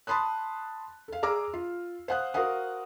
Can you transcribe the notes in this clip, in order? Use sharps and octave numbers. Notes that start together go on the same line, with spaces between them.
A5 B5 C6 D#6 F#6
A4 F5
G#4 D5 A#5 D6 E6 F6
F4
C5 F5 F#5 D#6 F#6
F#4 A#4 C5 F5 F#5 D#6